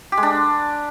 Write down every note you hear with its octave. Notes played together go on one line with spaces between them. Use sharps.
G4
G#3
D4